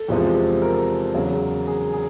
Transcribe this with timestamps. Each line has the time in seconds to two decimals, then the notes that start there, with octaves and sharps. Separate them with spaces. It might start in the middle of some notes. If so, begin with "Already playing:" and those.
Already playing: A4
0.08 E2 C3 F3 G#3
0.62 A#4
1.14 E2 C#3 F#3
1.67 G#4
1.93 G#4